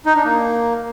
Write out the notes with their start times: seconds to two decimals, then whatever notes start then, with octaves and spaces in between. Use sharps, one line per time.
0.06 D#4
0.15 D4
0.25 A#3